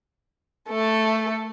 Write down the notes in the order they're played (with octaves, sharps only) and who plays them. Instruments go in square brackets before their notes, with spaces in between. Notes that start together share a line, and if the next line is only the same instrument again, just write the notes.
[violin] A3 A4